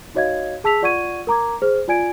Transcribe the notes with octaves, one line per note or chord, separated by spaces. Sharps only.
D#4 F#4 C#5 D#5 F5 G#6
G#4 A5 E6 B6 F7
F4 D5 F#5 C#6 G#6 D#7
A#4 A#5 D6 G#6
G#4 C5 F6
F4 D5 G#5 G#6 D7